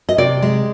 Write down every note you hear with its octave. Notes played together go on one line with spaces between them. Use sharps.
D#5
C3 D5
G#3